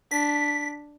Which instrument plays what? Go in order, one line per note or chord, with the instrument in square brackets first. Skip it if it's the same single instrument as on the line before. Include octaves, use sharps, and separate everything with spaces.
[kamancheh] D4 [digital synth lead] B6